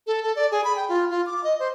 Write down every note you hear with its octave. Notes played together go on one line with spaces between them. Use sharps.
A4
A4
D5
G#4
B5
G5
F4
F4
D6
D#5
C5